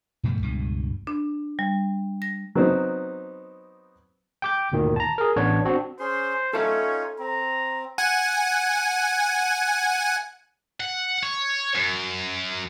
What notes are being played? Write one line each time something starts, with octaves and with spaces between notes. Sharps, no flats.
G2 B2 F3 A3
C#2 G2 B2
D4
G3
A#6
F#3 B3 C4 D#4
G5 D6 G6
G1 D2 A#2 D#3
A5 A#5
G#4 A#4
A1 B3 D4 C#5
C4 D4 F#4
C#4 G#4 C5 C6
C#4 D#4 F4 A4 C#5 E5 F5
C4 A#5
F#5 G#5
F#5
C#5
F#2